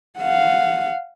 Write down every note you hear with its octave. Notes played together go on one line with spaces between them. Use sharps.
F5 F#5